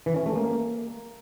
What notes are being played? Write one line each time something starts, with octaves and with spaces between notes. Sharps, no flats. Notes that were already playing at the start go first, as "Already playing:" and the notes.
E3
C#4
A3
A#3